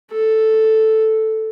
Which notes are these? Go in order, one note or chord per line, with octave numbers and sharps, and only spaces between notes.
A4